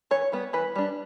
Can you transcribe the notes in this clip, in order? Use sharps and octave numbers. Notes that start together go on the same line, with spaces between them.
E3 C#5
G3 B3
E3 B4
G3 D4